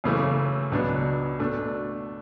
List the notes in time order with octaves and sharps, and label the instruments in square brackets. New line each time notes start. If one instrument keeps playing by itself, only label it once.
[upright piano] F#2 C#3 E3 A3
C#2 B2 F#3 B3 D4
B2 A3 D4